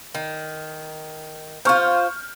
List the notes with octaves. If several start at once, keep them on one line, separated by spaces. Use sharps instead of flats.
D#3
F4 C5 C#6 F6 G6